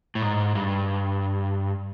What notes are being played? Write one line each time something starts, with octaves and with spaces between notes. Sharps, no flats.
A2
G#2
G2